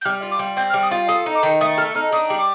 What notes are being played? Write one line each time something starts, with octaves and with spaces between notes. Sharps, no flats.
G6
G3 F6
F4
D6
G3
C4 G6
F6
G3
D#6
F4
A4 D#6
D#4
D6
D#3
A3 D#6
A4 F6
D#4 F6
D4 D#6
G3
D6